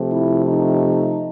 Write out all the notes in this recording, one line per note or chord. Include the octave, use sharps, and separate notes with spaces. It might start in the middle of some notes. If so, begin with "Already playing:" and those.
Already playing: C3 F3 A3
E4
D#4